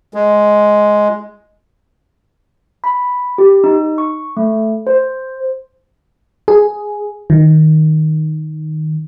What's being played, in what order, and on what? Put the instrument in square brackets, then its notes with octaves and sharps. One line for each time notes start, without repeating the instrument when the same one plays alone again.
[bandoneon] G#3
[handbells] B5
G4
D#4
C#6
A3
C5
[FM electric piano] G#4
D#3